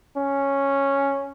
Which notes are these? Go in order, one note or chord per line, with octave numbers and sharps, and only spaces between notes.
C#4